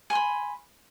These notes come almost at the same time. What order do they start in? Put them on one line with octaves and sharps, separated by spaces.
G#5 C6 B5